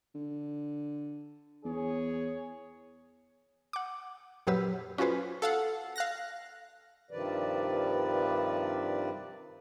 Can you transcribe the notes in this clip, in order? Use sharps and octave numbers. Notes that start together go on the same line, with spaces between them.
D3
E2 G#4 C#5
F#5 D6
F#2 A#2 F#3 G4 B4 E6
C#4 F4 F#4 G#4 B4 C5
A4 F5 F#5
F5 F#6 A#6
G2 C3 D#3 F3 B4 D5